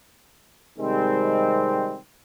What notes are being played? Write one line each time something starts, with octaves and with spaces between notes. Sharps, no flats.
C3 D#3 G3 G#3 C4